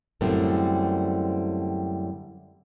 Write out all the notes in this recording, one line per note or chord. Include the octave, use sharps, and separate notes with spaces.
F#2 A2 D3 G3 C4